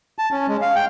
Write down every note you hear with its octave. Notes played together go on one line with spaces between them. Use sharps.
A5
C#4
G#3
F5
G5